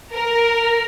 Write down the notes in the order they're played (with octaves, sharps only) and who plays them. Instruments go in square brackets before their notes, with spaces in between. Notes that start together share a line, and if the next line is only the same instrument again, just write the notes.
[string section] A#4